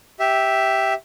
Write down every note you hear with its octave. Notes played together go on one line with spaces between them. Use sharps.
G4 E5